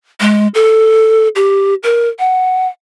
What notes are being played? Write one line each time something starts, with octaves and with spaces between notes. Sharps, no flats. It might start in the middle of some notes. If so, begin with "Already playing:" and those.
G#3
A4
G4
A#4
F#5